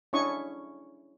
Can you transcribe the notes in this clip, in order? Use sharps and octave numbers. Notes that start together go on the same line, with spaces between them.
C#4 D4 E4 C#5 C#6 D#6